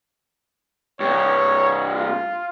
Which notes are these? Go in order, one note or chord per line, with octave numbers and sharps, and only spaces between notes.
G2 C3 C#5
F4